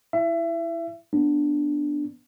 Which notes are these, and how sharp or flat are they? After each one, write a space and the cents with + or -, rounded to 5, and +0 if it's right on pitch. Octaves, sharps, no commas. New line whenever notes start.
E4 +0 E5 +30
B3 +0 D4 +0